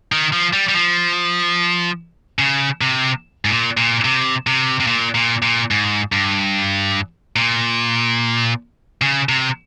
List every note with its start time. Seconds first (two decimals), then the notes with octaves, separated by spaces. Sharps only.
0.12 D#3
0.33 F3
0.53 G3
0.69 G3
0.74 F3
2.39 C#3
2.81 C3
3.45 G#2
3.49 A#2
3.77 A#2
4.05 C3
4.47 C3
4.80 C3
4.87 A#2
5.15 A#2
5.42 A#2
5.71 G#2
6.12 G2
7.36 A#2
9.02 C#3
9.29 C3